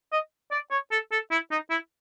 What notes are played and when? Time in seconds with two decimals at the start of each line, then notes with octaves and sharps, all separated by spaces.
0.12 D#5
0.51 D5
0.71 C#5
0.92 A4
1.12 A4
1.31 E4
1.51 D#4
1.70 E4